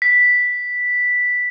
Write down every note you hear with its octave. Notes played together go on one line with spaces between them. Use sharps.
B6